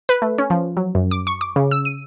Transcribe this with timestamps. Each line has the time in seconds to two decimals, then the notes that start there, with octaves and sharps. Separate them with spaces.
0.09 B4
0.22 A3
0.38 C#4
0.50 F3
0.77 F#3
0.95 F#2
1.11 D6
1.27 C#6
1.41 D6
1.56 C#3
1.71 E6
1.85 D#7